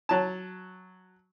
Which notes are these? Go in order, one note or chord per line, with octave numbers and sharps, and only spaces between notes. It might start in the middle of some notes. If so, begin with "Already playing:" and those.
F#3 A5